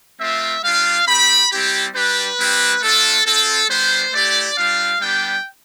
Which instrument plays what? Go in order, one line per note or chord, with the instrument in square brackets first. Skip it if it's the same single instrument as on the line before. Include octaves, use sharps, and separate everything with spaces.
[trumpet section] A3 C4 F4 E5
G3 D4 F4 F5
C4 G4 B5
G3 C4 E4 G4
G3 D4 G4 B4
G3 C4 E4 G4
A3 D4 F4 A4
C4 F4 A4
G3 B3 D4 C5
A3 E4 G4 D5
G3 D4 F4 F5
G3 B3 D4 G4 G5